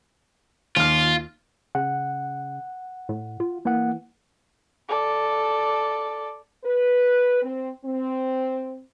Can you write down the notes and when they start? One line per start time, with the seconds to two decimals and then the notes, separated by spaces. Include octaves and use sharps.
0.76 D#2 F4 F6
1.75 C#3 F#5
3.09 A2
3.40 F4
3.65 E3 A#3 F#5
4.89 A4 D5
6.65 B4
7.43 C4
7.85 C4